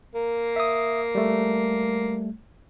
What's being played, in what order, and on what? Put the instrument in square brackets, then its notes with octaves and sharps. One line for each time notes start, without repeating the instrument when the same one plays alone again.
[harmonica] A#3
[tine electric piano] E5 D#6
G3 A3